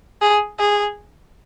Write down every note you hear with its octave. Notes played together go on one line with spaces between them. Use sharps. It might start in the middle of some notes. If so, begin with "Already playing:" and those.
G#4
G#4